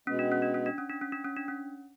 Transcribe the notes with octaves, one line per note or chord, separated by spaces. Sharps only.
B2 G#3 B3 C#4
D4
C#4
D4
C#4
D4
C#4
D4
C#4
D4
C#4
D4
C#4